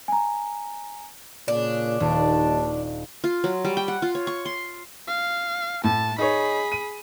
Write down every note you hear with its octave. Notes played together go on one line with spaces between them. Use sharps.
G#5 A#5
A#2 C#3 D4
D#1 D#2 A5
F4
F#3
G3
G5
F#5
F4
C#5
C#6
C6
F5
A2 A5
D#4 G#4 C#5 B5
D#7